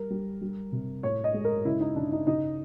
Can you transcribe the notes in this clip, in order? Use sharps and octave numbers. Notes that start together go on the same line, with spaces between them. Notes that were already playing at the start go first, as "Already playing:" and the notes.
Already playing: G3 A#4
G3
G3
C3
A2 C#5
D#5
G#3
A#4
C#3 E4
D#4
C#3 D4
D#4
C#3 D#4